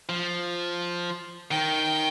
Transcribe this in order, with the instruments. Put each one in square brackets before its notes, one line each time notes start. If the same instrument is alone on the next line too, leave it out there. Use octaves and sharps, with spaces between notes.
[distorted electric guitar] F3
[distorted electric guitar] D#3 [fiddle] G5